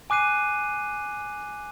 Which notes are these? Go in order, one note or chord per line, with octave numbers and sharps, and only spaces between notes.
G#5 D6 F#6 C7 D#7